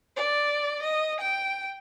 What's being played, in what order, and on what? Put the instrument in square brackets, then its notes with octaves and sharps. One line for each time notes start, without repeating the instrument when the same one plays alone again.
[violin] D5
D#5
G5